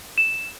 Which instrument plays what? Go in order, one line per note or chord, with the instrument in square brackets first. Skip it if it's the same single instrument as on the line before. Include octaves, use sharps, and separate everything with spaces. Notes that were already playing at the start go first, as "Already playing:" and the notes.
[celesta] E7